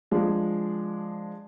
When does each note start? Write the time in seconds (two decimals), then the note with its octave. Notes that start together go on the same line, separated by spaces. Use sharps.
0.11 F3 G#3 D4